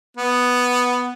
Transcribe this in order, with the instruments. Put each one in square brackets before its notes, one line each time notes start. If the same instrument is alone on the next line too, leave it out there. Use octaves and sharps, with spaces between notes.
[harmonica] B3